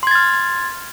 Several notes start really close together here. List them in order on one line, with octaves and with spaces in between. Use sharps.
C6 G#6 A6 F6